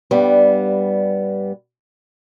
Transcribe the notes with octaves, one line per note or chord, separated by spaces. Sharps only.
G2 G3 B3